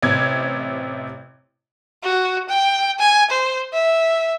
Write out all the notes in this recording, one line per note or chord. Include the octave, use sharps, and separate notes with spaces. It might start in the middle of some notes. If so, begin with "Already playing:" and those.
A1 C3 G#6
F#4
G5
G#5
C5
E5